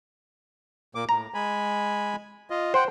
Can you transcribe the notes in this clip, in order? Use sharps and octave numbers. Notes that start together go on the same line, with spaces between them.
A#2 A#3 D6
A2 A#5
G#3 G#5 B5
F4 D#5
C5 F#5 G5